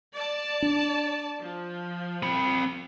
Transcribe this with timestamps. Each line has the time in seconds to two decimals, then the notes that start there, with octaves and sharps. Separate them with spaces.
0.17 D5 A5
0.62 D4
1.41 F3
2.23 C4 B5